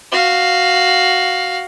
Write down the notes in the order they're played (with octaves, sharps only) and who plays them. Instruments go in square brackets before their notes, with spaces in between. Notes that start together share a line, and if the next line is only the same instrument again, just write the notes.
[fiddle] F#4 F5